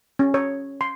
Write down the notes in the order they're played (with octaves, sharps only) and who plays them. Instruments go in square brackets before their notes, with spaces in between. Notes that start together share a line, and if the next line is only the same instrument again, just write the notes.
[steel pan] C#4
C#5
C6